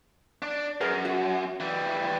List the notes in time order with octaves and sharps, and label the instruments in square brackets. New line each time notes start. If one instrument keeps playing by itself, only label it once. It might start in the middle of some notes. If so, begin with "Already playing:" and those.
[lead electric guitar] D4 D5
[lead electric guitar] F#2 [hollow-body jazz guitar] G#4 A#4 B4
[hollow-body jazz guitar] F#4
[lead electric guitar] E3 G3